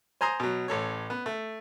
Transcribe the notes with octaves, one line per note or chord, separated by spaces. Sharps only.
C5 G#5 A#5 C6 D#6
B2 F#3
A1 A4 C#5
B3
A3